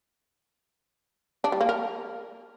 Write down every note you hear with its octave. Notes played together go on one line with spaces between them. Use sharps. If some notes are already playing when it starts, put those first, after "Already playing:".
D4
G3
A#3
A#4